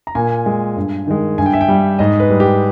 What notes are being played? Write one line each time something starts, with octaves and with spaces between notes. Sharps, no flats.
A#5
A#2 G#5
G#3
G2
D#3 G#3
G2 G#5
G5
E5
G5
G3
G#2 D#5
B4
G3
G4